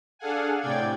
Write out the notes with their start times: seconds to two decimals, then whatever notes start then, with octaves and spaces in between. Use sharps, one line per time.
0.19 D4 G#4 A4 F5 F#5 G#5
0.61 A2 C3 D5 G5 G#6